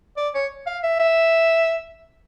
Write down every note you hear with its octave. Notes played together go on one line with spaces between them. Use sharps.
D5
C#5
F5
E5
E5